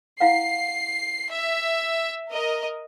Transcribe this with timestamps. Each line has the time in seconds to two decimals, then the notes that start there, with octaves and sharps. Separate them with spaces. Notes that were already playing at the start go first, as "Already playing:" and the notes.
0.20 E4 F5 F#5 C7
1.32 E5
2.29 A#4 D#5